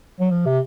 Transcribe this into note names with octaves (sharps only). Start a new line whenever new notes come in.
F#3
F3
C3